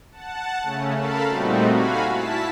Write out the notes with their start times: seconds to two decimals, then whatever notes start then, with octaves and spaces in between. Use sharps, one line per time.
0.12 F#5 A5
0.63 C#3 A3 C#4
0.96 A4 A#4 F5 A5 B5
1.27 A#2 G3 A3 C4 D#4 F#4
1.71 F#4 F5 G#5 B5
2.06 E4 A5 B6